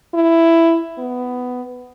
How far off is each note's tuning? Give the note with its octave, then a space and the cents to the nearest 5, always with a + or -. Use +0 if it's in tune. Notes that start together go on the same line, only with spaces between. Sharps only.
E4 +10
B3 +10